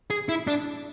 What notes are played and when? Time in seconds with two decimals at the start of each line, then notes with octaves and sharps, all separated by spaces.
0.10 G#4
0.29 E4
0.47 D4